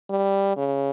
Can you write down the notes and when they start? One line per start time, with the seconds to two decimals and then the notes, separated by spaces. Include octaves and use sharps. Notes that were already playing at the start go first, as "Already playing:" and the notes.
0.10 G3
0.57 C#3